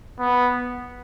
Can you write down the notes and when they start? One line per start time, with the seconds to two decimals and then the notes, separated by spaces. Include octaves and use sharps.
0.19 B3